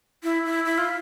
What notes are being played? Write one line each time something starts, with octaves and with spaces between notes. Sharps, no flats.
E4
E4
E4
F4